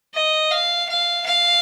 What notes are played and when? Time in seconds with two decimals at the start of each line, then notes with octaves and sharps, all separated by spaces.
0.14 D#5
0.51 F5
0.89 F5
1.26 F5